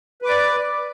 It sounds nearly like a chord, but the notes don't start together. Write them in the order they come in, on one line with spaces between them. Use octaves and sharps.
B4 D6 D5